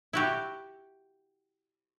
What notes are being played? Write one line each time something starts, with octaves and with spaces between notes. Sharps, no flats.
E4 F#4 G4